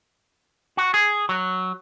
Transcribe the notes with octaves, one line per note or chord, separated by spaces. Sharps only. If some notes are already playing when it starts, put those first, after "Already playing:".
F#4
G#4
F#3